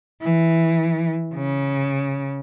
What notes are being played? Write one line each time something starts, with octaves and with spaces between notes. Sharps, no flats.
E3
C#3